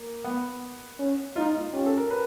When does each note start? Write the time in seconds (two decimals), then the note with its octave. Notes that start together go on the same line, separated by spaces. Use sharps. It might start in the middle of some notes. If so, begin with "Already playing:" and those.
Already playing: A#3
0.25 B3
0.99 C#4
1.36 D#4 F4
1.55 F4
1.73 C#4 G4
1.86 A4
1.97 A#4
2.10 B4